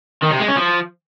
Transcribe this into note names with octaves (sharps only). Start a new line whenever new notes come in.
D#3
C3
G#3
C#4
F3